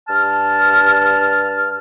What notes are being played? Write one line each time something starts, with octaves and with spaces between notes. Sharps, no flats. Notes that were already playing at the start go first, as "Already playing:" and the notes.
G2 A5 F6